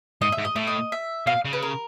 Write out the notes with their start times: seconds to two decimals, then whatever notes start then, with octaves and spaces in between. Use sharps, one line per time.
0.22 G#2 D#5
0.32 E5
0.38 G#2
0.45 D#5
0.56 A2 E5
0.67 D#5
0.92 E5
1.26 B2 F5
1.45 C#3
1.53 B4
1.62 A#4